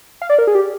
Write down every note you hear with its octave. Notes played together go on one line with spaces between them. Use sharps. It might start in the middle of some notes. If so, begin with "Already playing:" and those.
F5
D5
A#4
G#4
G4